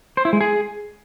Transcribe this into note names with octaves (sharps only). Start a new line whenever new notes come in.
C5
E4
G#3
G#4